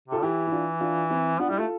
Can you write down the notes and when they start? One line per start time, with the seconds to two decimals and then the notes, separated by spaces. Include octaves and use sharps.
0.08 C3 F4 A4
0.22 E3 E4 G4
0.47 E4
0.52 D4 F4
0.80 D4 F4
1.10 C4 E4
1.39 B3 D4 F4
1.49 G3 E4 G4
1.58 A3 F4 A4